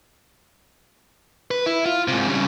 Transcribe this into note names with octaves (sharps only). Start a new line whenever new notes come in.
B4
E4
F4
G#2 C3
C#3 G3